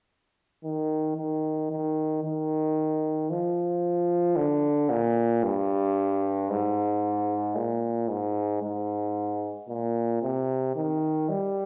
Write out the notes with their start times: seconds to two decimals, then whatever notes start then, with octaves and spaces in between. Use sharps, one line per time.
0.64 D#3
1.17 D#3
1.71 D#3
2.24 D#3
3.30 F3
4.37 D3
4.90 A#2
5.43 G2
6.50 G#2
7.57 A#2
8.09 G#2
8.62 G#2
9.69 A#2
10.22 C3
10.75 D#3
11.29 G3